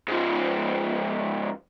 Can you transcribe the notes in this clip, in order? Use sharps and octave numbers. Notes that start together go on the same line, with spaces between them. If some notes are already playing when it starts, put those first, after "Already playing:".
G#2 F3